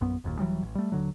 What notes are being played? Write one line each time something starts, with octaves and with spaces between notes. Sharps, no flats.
A#1 F#2 B3
F#1 D#2 A#2
D#1 E3 F#3 G3
A1
G3 A3
D#1 D3 F#3